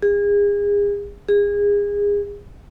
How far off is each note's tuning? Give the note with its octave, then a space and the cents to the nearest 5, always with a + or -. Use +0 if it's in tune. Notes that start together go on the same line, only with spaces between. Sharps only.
G#4 -35
G#4 -30